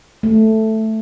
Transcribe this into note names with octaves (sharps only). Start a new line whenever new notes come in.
A3